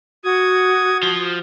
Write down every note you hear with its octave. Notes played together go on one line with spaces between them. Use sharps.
F#4 D#6 G#6
F3